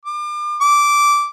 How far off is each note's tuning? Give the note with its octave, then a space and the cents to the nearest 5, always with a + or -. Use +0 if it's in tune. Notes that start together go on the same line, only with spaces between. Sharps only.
D6 +35
D6 -10